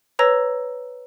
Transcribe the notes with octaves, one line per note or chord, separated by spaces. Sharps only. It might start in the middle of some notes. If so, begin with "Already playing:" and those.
B4 C#5 A#5 E6 A#6